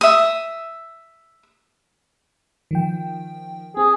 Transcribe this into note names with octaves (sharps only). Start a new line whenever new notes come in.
E5 D#6
D#3 F3 G5
C4 G#4